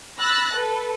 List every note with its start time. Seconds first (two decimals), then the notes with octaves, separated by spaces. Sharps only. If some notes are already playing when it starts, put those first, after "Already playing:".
0.20 B5 E6 F#6 A6 A#6
0.55 A4 B4